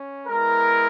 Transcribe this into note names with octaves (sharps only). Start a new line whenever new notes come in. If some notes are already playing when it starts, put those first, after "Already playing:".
Already playing: C#4
G#3 B3 E4 A#4